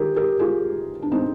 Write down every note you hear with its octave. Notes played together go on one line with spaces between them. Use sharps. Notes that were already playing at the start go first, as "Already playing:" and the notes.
Already playing: D#3 G4 G#4 A#4
G4 A#4
F4 G#4
D4
C4 D#4